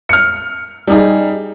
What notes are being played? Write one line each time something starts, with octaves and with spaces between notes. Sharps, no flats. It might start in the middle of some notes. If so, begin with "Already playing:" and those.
F6 C#7
G3 D#4 G#4